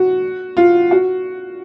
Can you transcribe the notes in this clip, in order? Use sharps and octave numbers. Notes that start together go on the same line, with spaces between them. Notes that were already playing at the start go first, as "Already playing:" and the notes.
Already playing: F#4
F4
F#4